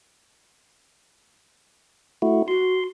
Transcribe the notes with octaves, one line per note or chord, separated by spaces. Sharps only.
A3 E4 F#4
F#4 C6